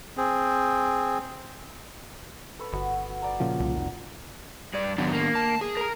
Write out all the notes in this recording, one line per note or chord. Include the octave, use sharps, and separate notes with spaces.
C4 G#4
A4 B4 C#6
G1 B3 F#4 F#5
D5 F#5 A#5
A#2 C#3 F3
C2
F1
G2 D5
F#2 D#3 B3 D4
A#3
A5
G#4
A#4 A#5